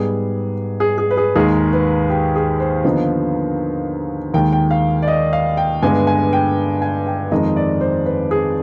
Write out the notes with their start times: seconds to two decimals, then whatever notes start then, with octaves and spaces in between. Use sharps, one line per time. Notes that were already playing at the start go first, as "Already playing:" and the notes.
Already playing: G#2 G3 B3 G#4
0.80 G#4
0.98 G#4
1.11 B4
1.17 G#4
1.36 D#2 D#3 G#3 G#4
1.73 B4
2.10 G4
2.35 G#4
2.60 C5
2.84 D#2 D3 F3 B3 D#4
4.34 D#2 D#3 G#3 G5
4.53 G5
4.71 F5
5.02 D5
5.08 D#5
5.33 F5
5.57 G5
5.82 G2 D3 G#3 B3 G#5
6.07 G#5
6.33 G5
6.82 G#5
7.07 G5
7.32 F2 D#3 G#3 C4 D#4 D#5
7.56 D5
7.81 C5
8.06 B4
8.31 G#4